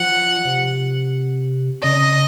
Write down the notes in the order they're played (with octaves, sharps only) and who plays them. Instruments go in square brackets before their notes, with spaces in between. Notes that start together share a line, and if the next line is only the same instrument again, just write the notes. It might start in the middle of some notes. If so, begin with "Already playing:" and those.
Already playing: [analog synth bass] F3 [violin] F#5
[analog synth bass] C3
[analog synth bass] C#3 [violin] D#5